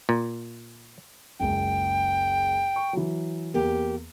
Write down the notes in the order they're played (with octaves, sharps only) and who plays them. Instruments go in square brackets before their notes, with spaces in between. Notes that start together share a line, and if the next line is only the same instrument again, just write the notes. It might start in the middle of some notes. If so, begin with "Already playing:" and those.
[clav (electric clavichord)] A#2
[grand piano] F#1 C#2 [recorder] G5
[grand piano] C#6
E3 F#3
[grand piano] E2 A#3 [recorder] G4